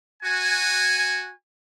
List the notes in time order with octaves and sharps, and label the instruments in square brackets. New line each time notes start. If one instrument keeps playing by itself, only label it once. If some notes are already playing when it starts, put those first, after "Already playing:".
[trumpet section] F#4 G#5